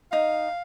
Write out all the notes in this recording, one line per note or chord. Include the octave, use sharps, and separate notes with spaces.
D#4 F5